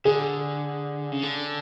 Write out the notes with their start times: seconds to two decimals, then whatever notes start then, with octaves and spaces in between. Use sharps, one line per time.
0.05 D3 G#4
1.12 C#3
1.23 D3